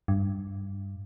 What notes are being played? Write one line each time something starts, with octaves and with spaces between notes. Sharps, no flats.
G2